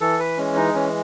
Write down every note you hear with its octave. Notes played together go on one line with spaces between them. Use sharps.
E3 A4
B4
G#3 C#4
D#4
E3 C#4